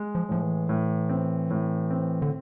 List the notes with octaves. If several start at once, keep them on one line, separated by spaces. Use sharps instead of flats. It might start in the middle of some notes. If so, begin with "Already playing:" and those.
Already playing: G#3
F3
A2 F3
E3
A2
C4
A2
C4
D3